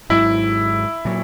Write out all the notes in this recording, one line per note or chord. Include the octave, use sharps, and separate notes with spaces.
G#1 G#2 F#3 E4
A#2 F#3